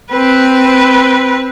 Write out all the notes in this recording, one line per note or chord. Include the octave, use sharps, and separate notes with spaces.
C4 B4